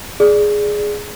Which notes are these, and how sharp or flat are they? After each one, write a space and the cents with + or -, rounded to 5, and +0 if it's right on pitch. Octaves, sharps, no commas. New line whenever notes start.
G#4 +0 D5 +0